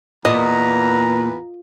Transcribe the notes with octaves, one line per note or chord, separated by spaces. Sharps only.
E2 A#2 B4 D#5 A#5